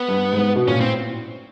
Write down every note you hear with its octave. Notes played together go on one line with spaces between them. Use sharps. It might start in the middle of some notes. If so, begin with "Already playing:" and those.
Already playing: B3
G2
G#2
B2
A#2 C#4
A2 C4